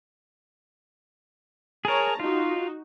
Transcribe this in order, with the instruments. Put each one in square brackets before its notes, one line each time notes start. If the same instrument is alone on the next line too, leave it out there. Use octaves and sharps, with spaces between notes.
[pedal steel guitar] G#4 A#4 [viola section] C#5 A5 A#5
[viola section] D#4 F#4 [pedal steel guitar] F4